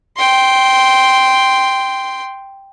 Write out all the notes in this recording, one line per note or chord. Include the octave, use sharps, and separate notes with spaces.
G5 C6